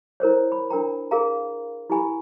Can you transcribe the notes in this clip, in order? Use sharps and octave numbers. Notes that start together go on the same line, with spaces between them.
E4 A#4 C5 C#5
B5
D4 A#4 G5 A#5
G#4 A#4 F5 A#5
E4 G4 G#5 B5